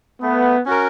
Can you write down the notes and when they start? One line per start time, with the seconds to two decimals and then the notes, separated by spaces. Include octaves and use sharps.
0.22 A3 B3
0.66 C#4 F#4 A#4